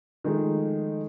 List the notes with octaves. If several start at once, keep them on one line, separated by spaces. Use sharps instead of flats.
D#3 F3 G#3 A3 D#4